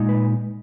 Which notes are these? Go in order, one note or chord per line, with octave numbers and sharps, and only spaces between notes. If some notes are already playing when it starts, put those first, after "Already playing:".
Already playing: A#2 G#3 D#4
B4